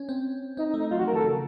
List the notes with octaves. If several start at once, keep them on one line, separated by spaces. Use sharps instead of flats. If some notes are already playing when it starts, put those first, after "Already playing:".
Already playing: C#4
C4
C4 D#4
D#4
A3
D#4
F#3 F4
F#4
F3
A#4
D#3 A4
C#3